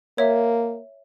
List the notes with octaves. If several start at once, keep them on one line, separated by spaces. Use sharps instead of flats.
A#3 C#5 E5